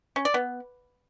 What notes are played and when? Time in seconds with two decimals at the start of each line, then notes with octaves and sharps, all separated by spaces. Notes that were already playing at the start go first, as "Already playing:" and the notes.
0.16 C#4
0.25 D5
0.34 B3